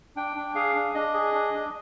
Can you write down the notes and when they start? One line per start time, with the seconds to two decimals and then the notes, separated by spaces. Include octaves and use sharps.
0.16 D4 G5
0.36 D4
0.55 G#4 F5
0.75 D4
0.95 D4 D#5
1.14 G#4
1.34 D4
1.53 D4